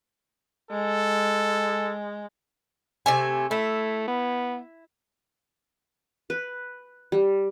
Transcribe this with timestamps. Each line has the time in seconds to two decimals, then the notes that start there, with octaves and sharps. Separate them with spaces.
0.71 G#3 A4
3.06 C3 A3 G#5
3.51 A3 E4
4.08 B3
6.30 B4
7.12 G3